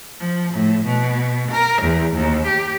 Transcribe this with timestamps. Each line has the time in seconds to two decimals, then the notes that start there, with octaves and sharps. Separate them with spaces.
0.20 F3
0.54 A2
0.85 B2
1.51 A#4
1.82 E2
2.15 D#2
2.46 G4